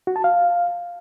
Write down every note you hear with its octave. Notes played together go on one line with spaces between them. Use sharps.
F#4
A5
F5